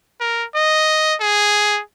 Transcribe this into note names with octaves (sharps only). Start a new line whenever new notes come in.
A#4
D#5
G#4